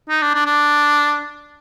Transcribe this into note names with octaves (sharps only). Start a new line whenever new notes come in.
D#4
D4
D4
D4